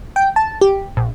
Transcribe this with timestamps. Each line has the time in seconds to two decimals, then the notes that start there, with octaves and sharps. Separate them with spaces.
0.16 G5
0.36 A5
0.61 G4
0.97 A#1